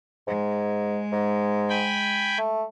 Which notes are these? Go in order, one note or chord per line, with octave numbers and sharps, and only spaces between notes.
G#2 G#3
G#2
G5 G#5 B5
A3